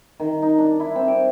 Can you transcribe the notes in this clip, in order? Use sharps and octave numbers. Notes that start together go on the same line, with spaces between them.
D#3
D#4
D4
E4
C4
D6